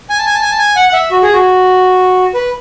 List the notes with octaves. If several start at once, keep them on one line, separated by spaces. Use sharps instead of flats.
G#5
A5
G#5
A5
G#5
A5
G#5
F#5
F#5
E5
F#4
G#4
F#4
B4